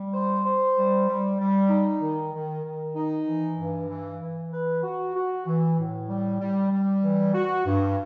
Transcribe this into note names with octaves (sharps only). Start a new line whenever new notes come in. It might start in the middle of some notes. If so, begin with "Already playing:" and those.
Already playing: G3
C5
C5
G3
G3
G3
D#4
D#3
D#3
D#3
D#4
E3
G2
E3
E3
B4
F#4
F#4
E3
A2
G3
G3
G3
E3
F#4
G2